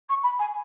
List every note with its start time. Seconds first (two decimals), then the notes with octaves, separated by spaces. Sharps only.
0.09 C#6
0.23 B5
0.39 G#5